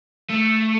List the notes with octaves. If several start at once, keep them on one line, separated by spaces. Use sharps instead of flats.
A3